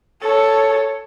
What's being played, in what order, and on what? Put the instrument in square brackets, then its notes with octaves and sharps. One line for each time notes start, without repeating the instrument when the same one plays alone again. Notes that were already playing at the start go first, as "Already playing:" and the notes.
[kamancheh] A4 C#5